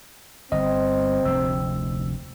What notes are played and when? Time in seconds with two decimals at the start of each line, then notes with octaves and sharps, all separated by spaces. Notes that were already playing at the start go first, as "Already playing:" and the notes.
0.52 G1 C4 D#5
1.25 F1 D2 E6